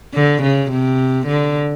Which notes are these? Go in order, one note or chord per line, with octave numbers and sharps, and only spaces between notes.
D3
C#3
C3
D3